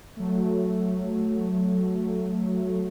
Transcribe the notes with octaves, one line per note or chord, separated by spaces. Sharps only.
F#3 A3